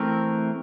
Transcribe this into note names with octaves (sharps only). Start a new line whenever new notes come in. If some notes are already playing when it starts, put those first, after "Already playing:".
Already playing: E3 A3 C4 A#4